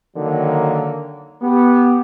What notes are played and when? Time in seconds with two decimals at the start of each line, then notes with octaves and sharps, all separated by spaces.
0.16 D3 D#3 F#3 A#3
1.41 B3 G4